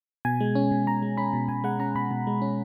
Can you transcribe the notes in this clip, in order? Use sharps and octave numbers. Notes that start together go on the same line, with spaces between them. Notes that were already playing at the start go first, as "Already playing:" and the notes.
B2 G#5
G#3
C#4
B2
B2 A#5
G#3
C#4 B5
B2
B2 G#5
G#3 F#5
C#4 A#5
B2 B5
B2
G#3
C#4